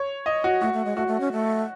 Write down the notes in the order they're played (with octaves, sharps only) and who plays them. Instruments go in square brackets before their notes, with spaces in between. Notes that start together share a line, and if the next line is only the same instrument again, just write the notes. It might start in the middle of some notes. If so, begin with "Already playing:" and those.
Already playing: [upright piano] C#5
D#5
F#4
[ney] A3 [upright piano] F#4
[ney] A3
G#3
[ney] A3 [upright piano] F#4
[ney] A3
C#4
A3